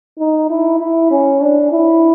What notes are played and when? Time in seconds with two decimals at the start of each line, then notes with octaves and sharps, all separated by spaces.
0.19 D#4
0.50 E4
0.80 E4
1.11 C#4
1.41 D4
1.72 E4